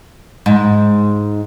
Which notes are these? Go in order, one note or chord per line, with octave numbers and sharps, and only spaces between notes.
G#2